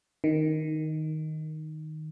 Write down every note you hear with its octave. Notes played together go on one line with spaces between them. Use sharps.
D#3